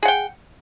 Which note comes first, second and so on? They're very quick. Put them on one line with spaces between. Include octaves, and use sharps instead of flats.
G#4 F#5 G5